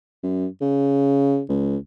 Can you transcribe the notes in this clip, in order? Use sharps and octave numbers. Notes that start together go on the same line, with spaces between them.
F#2
C#3
C#2